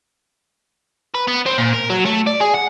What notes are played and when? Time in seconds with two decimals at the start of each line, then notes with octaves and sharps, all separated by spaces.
1.15 B4
1.28 B3
1.46 C4
1.58 A#2
1.73 A#4
1.90 F#3
2.05 A3
2.27 D5
2.40 G#4
2.54 F#5